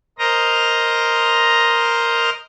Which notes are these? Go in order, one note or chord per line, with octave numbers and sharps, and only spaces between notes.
A#4 C5 D#5 A#5